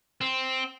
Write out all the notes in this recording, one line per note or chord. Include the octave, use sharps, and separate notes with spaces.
C4